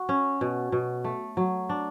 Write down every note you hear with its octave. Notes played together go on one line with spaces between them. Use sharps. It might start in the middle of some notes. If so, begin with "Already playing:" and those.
Already playing: F#4
C#4
B2
B2
A3
F#3
D4